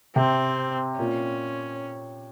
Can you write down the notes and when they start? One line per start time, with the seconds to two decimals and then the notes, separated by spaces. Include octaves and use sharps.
0.16 C3 C4
0.99 A#2 C#4